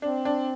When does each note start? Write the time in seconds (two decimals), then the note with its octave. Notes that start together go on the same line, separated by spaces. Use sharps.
0.02 C4 D4
0.25 D4